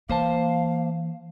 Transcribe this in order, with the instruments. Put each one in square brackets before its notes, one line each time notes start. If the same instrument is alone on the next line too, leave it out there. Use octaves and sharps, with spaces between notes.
[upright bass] E3 [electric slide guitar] A#3 C5 A5 [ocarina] F5